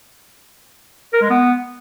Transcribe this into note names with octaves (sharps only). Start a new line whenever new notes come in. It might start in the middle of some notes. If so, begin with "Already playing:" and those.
A#4
G#3
B3